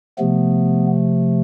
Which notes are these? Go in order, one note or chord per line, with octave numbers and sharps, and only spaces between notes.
C3 F3 A3 B3